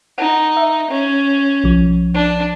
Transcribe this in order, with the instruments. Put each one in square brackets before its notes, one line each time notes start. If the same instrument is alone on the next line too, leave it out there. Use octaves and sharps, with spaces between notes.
[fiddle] D#4 [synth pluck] F#5
[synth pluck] E5
[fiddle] C#4
[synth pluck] B1 F3
[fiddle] D4